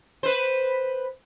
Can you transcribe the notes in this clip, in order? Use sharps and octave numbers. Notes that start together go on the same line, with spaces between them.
B4 C5